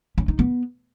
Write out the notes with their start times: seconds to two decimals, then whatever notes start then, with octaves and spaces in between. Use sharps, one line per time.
0.18 C#4
0.28 D#4
0.39 B3